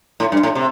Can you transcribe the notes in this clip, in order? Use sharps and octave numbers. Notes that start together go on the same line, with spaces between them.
A2
G2
A2
C3